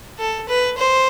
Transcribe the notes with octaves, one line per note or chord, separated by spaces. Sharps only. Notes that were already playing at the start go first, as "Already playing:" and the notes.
A4
B4
C5